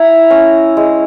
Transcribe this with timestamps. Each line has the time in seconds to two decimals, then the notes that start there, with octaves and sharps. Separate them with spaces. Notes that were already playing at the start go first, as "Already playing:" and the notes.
Already playing: E4 A#5
0.30 C#4
0.77 G#3